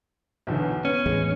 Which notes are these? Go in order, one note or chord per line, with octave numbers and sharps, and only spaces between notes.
B1 E2 D3
B3 C#4
A1 E2 G#3